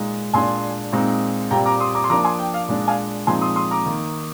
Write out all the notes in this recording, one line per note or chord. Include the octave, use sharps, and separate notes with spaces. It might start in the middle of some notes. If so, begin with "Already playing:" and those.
Already playing: A#2 G#3 D#4
A#2 G#3 D4 G#5 C6
A#2 G#3 C4 D#4
A#2 G3 C4 G5 A#5
A#5 D6
C6 D#6
A#5 D6
C6
F3 A#3 D4 A#5 D6
G#5 C6
G5
F5
A#2 G#3 D4
F5 G#5
A#2 F3 G#3 C4 D#4 G#5 C6
C6 D#6
C6 D#6
A#5 D6
D#3 A#3 D#4